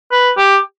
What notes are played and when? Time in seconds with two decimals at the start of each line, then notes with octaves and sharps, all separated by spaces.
0.11 B4
0.38 G4